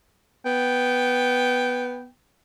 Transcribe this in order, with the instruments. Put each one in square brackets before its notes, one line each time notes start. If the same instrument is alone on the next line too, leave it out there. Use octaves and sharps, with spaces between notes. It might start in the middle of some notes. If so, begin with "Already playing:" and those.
[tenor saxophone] B3 [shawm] G5